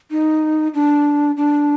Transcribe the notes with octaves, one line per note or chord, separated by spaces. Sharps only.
D#4
D4
D4